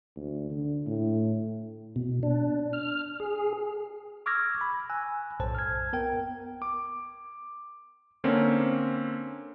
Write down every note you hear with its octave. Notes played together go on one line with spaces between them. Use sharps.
D2
D3
A2
B2
D4
F6
G#4
C#6 D6 E6 F6 G#6 A#6
B5
G#5 E6 F#6
B1 F#2 A2 C5 A5
F6 G#6
B3 A#4 G5
D6
D3 A#3 C4 C#4